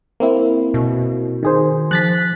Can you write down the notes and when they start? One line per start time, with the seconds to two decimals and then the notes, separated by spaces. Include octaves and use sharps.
0.20 A#3 C4 E4
0.74 B2
1.43 D#3 G#4 C5
1.91 F3 F#6 A6 B6